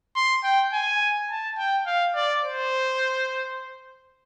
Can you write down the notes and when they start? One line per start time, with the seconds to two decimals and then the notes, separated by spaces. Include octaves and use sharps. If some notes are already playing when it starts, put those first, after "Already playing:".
0.16 C6
0.44 G5
0.73 G#5
1.30 A5
1.57 G5
1.86 F5
2.15 D5
2.43 C5